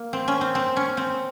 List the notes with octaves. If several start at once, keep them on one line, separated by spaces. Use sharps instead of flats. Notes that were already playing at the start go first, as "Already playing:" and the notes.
Already playing: A#3
C4
C#4
C4
C4
C#4
C4